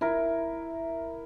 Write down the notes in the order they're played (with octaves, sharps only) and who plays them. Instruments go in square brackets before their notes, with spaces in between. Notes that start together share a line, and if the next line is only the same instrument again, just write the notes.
[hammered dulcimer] E4 A#4